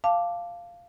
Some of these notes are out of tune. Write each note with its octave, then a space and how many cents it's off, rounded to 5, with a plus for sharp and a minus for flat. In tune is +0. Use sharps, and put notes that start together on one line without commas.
F5 -5 A5 +0 D6 +0